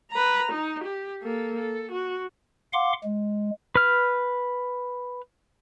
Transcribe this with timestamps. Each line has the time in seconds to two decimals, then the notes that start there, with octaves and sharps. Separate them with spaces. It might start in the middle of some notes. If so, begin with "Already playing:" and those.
0.11 B4 A#5
0.52 D#4
0.84 G4
1.22 A#3 A4
1.59 A4
1.92 F#4
2.73 F5 F#5 C6 D6
3.03 G#3
3.75 B4 F6